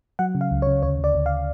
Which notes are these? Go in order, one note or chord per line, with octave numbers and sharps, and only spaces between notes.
F#3 F#5
C#3
F5
C#2
C#5
C#3
D2 C#5
D2 D5
D2
F5